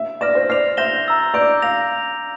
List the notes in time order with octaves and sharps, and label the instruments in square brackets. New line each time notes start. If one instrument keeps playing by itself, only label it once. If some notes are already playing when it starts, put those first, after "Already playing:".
Already playing: [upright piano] E5
[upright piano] D5 [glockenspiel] F6 A#6 E7
[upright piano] C5
[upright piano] D5 [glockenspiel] F6 C7 F7
[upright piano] E5 [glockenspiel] C6 G6 A#6 E7 G7
[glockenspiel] A#5 E6 A6
[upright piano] D5 [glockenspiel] D6 G6 D7 F7
[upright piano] F5 [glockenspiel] E6 A#6 F7